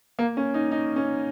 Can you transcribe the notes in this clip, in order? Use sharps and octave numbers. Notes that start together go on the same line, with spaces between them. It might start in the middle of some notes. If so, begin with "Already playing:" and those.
A#3
C#4
D#4
D#4
C#4